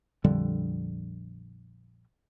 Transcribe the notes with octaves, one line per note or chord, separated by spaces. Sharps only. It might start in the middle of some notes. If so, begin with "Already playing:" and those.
A#1 F2 D3 G3